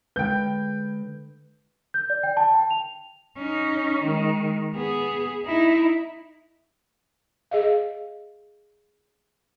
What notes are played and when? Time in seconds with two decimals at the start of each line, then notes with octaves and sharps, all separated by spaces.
0.16 D3 G#3 B4 G5 G6
1.94 G6
2.10 D5
2.23 G5
2.37 A5
2.54 G5
2.70 F7
3.37 C#4 D#4
4.03 D#3 G#3
4.74 B3 G#4
5.45 D#4 E4
7.51 G#4 D#5 F5